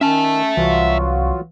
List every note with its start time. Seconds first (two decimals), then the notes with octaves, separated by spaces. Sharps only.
0.01 D#3 C#4 E5 A5
0.57 C2 E3 F#3 F4 F#4